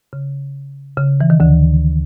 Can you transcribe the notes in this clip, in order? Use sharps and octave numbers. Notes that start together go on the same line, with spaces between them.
C#3
C#3
E3
D#3
D2 D3